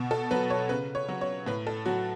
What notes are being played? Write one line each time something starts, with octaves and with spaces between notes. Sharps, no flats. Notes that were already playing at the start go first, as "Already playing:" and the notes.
Already playing: B2
A4
F#3 B4
C#5
C#3 B4
C#5
F#3
C#5
A2 B4
A4
F#3 F#4